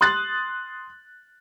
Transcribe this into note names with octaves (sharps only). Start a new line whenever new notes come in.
C6 D#6 F#6 A6